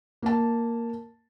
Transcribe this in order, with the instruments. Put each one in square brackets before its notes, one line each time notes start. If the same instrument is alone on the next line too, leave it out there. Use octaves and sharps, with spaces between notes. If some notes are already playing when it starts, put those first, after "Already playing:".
[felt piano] A#3 A5